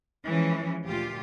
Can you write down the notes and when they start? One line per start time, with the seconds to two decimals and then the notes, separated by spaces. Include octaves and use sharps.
0.24 E3 F3 G#3 C#4
0.85 D2 A#2 F4 G4